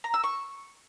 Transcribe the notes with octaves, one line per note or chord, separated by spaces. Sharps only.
A#5
E6
C#6